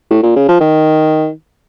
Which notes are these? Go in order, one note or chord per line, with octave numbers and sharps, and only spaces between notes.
A2
A#2
C#3
F3
D#3